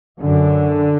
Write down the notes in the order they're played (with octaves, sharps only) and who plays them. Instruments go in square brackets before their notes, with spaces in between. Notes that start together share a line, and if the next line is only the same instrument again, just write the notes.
[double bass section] F#2 D3